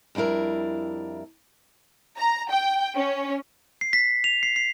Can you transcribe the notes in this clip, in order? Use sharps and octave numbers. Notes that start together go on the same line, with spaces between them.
F2 G3 D4 E4 A#4
A#5
G5
C#4
C7
B6
F7
C7
C7